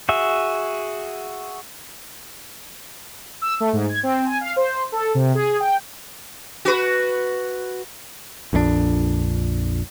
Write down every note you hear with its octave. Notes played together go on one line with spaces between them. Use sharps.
F#4 G#4 E5
E6
A3
G#2
G#6
C4
G#5
F5
C5
A4
C3
G#4
G5
F#4 B4
A#1 F2 E3 D4